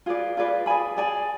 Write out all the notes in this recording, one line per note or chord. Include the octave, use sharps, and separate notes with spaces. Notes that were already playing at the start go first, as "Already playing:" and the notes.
F4 G#4 B4 D5
F4 G#4 B4 D5
G#4 D5 G#5 B5
G#4 D5 G#5 B5